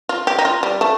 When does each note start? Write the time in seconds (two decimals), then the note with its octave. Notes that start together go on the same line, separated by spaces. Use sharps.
0.09 F4
0.27 G4
0.38 D#4
0.45 F4
0.63 G3
0.81 A3